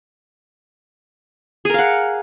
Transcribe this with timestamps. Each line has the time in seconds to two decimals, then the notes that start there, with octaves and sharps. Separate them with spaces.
1.65 G#4
1.70 A#4
1.74 F5
1.78 F#5